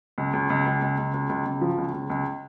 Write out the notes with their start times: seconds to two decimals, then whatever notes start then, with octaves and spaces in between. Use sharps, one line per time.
0.18 C#2
0.33 C#2
0.50 C#2
0.66 C#2
0.82 C#2
0.98 C#2
1.14 C#2
1.29 C#2
1.46 C#2
1.61 F3
1.78 C#2
1.93 C#2
2.10 C#2